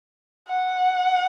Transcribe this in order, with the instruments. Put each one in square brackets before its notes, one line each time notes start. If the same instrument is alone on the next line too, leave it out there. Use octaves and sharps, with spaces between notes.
[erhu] F#5